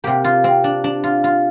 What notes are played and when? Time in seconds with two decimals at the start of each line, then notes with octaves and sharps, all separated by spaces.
0.04 C3 A#3 G4
0.24 F4
0.44 C4
0.64 D4
0.84 D4
1.04 F4
1.24 F4